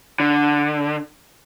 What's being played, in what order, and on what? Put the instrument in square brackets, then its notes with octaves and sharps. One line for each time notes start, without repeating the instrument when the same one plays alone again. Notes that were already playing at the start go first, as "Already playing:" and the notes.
[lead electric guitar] D3